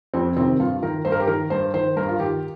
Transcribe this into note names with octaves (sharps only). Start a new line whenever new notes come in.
F2 C4
C3 D#3 C4
G2 F4
D#3 A#4
G2 C5
A#4
G4
D#3 A#4
G2 C5
D#3 C5
G2 A#4
F4
D#3 G4